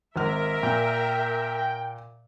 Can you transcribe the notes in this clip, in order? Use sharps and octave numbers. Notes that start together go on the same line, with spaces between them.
G#1 A#4 E5 F6
A#2 G5